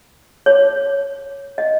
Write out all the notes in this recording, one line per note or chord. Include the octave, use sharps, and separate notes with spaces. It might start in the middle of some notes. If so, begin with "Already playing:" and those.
C#5
D#5